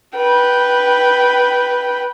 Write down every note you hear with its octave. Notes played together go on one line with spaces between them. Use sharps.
B4 G5